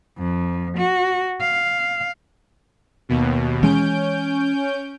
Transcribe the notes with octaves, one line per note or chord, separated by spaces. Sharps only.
F2
F#4
F5
D#2 B2
E3 G#3 C#4 G6 D7